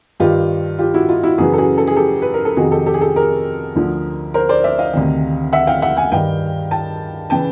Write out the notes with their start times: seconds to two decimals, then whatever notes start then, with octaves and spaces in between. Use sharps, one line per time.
0.20 G2 D#3 F4 G4
0.79 F4 G4
0.94 E4 F#4
1.08 D#4 F4
1.23 E4 F#4
1.38 F#2 C#3 E3 F#4 G#4
1.53 A4
1.58 F#4 G#4
1.78 A4
1.87 G#4
1.96 G4 A4
2.22 B4
2.34 A#4
2.45 A4
2.57 F2 C3 D#3 F#4 G#4
2.71 G4 A4
2.86 G4 A4
2.94 G#4
3.01 G4 A4
3.16 G#4 A#4
3.76 D2 D3 F3
4.34 A#4 C5
4.49 C5 D5
4.64 D5 E5
4.78 D#5 F5
4.93 D2 C3 D#3
5.53 E5 F#5
5.67 F5 G5
5.82 E5 F#5
5.97 F#5 G#5
6.12 G2 D#3 F5 G5
6.71 G5 A5
7.30 C#3 E3 G5 A5